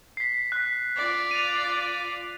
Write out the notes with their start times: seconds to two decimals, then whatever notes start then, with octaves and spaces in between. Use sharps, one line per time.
0.17 B6 C7
0.52 F#6 B6
0.97 F4 D5
1.31 D#7 F7